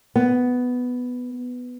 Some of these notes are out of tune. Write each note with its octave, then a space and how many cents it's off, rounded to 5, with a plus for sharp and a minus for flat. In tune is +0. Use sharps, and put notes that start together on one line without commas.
B3 +5